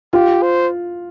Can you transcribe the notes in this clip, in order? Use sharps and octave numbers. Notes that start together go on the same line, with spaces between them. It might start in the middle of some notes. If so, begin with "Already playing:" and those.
F4 G4
C5